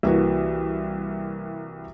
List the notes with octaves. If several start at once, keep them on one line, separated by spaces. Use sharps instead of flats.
C2 E3 A#3 F#4